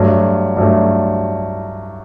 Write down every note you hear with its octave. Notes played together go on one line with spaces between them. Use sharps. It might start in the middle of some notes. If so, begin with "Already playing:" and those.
Already playing: G2 F#3 A3
G2 F#3 A3